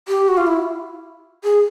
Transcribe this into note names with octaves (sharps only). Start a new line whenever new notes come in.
G4
F#4
F4
E4
G#4